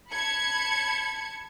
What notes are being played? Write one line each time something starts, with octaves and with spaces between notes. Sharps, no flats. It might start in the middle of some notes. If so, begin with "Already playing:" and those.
A5 B5 G#6 C#7